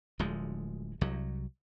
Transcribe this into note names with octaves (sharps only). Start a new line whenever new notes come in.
D1 D2 F3 G#3
C2 F#3